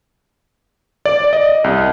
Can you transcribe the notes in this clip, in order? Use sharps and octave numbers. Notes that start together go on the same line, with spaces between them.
D5
D#5
C2